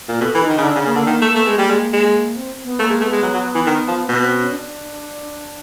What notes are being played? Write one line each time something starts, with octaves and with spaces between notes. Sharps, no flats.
A#2
B2 A4
E3
D#4
D#3
C#3
D3 D4
C#3 D4
C#3 A#3
D3 A#3
D#3 A#3
A3
A#3
A3
B3
G#3
A#3
G3
G#3
G#3
C4
B3
A3 A#3
G#3
A3 B3
G#3
F#3
F#3
E3
D#3
F3
B2 B3
B3
C4
C#4
D4